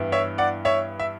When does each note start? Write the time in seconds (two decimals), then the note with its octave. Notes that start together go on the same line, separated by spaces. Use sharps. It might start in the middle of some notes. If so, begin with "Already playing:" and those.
Already playing: G2 E3 B3 E4
0.12 C#5 E5
0.38 D5 F#5
0.65 C#5 E5
1.00 E5